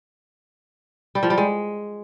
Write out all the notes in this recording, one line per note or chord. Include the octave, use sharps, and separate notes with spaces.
G3
F3
G3
G#3